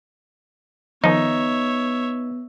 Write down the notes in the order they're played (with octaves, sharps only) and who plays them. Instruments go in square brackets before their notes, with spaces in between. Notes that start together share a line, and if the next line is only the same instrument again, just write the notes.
[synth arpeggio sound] D#3 F3 [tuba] B3 [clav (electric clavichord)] D#4 [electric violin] C#5 E5